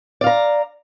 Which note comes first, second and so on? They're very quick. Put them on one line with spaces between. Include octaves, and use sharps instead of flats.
D5 F5 A#5